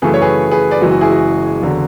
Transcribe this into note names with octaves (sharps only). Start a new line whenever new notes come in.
F#2 C#3 E3 A3 G#4 B4
C#5
G#4 B4
G#4 B4
B4 D5
F#1 F#2 E3 G#3 F#4
F#4
E4 G#4
F#4
F#1 E2 D3 F#3